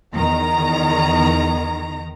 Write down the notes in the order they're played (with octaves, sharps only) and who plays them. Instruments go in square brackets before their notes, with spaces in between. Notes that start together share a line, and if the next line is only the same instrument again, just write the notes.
[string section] E2 D#3 A#5